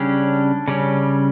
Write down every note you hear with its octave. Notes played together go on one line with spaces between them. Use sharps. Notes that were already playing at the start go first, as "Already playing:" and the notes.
Already playing: C#3 G3 C#4 D4
C#3 G3 C#4